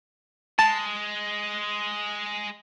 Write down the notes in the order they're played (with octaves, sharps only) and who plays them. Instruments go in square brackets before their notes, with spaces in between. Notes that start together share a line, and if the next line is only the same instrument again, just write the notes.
[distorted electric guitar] G#3 [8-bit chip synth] A5